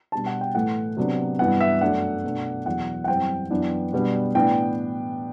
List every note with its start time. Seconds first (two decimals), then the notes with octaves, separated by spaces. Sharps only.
0.12 B2 G3 D4 A5
0.26 F#5
0.41 G5
0.55 A2 E3 A3 F#5
0.97 C3 F#3 B3 D4
1.39 G2 E3 B3 F#5
1.61 E5
1.81 F#2 F#3 A3 D4 F#5
2.24 B2 A3 D4
2.66 E2 B2 F#3 F#5
3.04 F#5
3.08 F#2 E3 G3 C4 G5
3.50 F#2 E3 B3 D4
3.93 B2 G3 B3 D4
4.35 A2 E3 B3 D4 G5